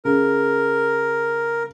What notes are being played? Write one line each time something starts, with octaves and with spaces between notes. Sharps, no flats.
C#3 A#4